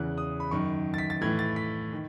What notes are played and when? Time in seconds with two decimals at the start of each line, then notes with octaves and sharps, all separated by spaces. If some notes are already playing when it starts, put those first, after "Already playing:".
Already playing: E2 C#3 E3 F#6
0.18 D#6
0.40 B5
0.51 F#2 D#3 C#6
0.94 A6
0.98 B6
1.10 A6
1.21 A2 E3 G#6
1.39 A6
1.56 B6
1.93 D#3